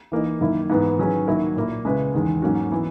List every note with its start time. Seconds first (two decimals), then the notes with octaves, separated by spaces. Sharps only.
0.12 E3 A#3 D#4
0.41 F#2 D#3 A#3 E4
0.70 G#2 E3 B3
0.98 D#3 F#3 C#4 G#4 B4
1.27 D#3 F#3 A#3 E4 A#4
1.56 A#2 A#3 E4
1.85 C#3 G#3 C#4 E4 B4
2.14 E2 D#3 G#3
2.42 G#2 F#3 A#3 C#4 F#4
2.72 E3 B3